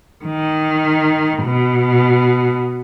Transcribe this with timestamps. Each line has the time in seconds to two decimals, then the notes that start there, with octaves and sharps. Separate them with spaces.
0.24 D#3
1.43 B2